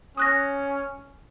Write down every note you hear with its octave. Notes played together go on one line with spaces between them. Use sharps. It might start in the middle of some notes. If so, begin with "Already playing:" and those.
C#4 D#6 F#6 A#6